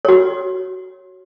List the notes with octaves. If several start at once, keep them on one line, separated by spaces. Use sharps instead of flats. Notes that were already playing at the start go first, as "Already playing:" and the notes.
F#4 C#5